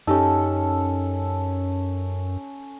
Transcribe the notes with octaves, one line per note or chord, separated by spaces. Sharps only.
F#2 C#4 D#4 G4 A4